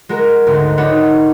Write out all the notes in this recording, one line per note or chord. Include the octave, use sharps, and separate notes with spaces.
G#3 F#4 A#4
G#1 D2
D4 D#4 F#4 B4 C#5 F#5